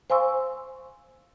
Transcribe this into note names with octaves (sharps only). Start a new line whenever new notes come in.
C5 F5 G#5 C6 C#6 E6